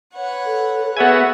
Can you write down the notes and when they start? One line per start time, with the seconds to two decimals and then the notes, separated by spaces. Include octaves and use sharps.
0.14 B4 C#5 F#5
0.46 A4
0.97 B3 F#4 G#4 E5 F#5 G#5